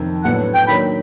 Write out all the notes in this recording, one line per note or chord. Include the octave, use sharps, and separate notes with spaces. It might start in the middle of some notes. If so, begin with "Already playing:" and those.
Already playing: F2 C3 D#3
A2 F#3 B3 D4 F#5
G5
D#3 F#3 A#3 D4 B5